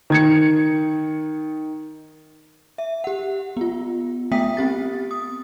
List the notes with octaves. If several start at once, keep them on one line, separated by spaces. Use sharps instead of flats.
D#3 G#6 C#7
E5
G4 F#5
B3 F4
A3 B3 E5 G5 D#6 B6
C4 G4 A6
D#6